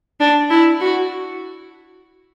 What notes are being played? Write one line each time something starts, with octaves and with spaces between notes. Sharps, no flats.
D4
E4
F#4